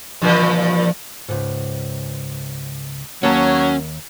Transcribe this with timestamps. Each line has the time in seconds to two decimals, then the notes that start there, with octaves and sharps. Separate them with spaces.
0.22 G2 A#2 E3 F3
1.29 C#2 G#2
3.23 D#2 F#3 A#3 C#4 A5